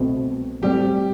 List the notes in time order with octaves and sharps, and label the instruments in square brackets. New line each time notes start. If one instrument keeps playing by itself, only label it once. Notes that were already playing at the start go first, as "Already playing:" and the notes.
Already playing: [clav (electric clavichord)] C2 B2 A3 C4
[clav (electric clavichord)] A2 G3 C4 [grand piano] G4